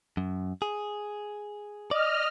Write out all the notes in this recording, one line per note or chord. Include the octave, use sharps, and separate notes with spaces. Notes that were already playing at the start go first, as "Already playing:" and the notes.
F#2
G#4
D5 D#5 F6